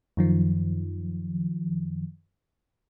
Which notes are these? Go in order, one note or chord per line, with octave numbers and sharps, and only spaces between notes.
F#2 D#3 F3